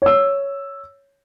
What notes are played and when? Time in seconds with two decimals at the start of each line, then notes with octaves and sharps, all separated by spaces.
0.02 C#5 E6